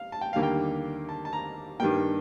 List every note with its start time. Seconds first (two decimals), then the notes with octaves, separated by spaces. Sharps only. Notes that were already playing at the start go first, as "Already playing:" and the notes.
Already playing: F5
0.12 A5
0.21 G5
0.33 D#2 D3 G3 A#3 F5
0.43 G5
1.09 A5
1.25 A5
1.33 A#5
1.80 G2 D#3 G3 A#3 G5